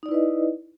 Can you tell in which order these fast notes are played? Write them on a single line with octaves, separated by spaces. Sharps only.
D#4 D5 E4 B4 D#5